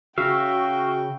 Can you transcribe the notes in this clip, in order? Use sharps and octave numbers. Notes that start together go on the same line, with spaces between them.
C#3 F#4 E5 F5 G5